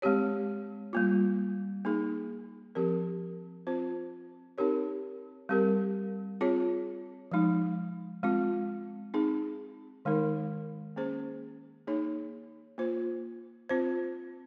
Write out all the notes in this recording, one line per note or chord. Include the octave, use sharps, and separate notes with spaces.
G#3 C4 G4 C#5
G3 A#3 F4
A#3 D#4 G#4
F3 C4 G4 A#4
C4 F4 C5
C4 D#4 G4 A#4 C#5
G3 C4 G4 A#4
C4 F4 G#4 C#5
F3 G#3 D#4
G#3 C4 F4
C4 D#4 G#4
D#3 G#3 D#4 A#4
A#3 C#4 G#4 C5
A#3 D#4 G#4 C#5
A#3 F4 C5
C4 F4 C5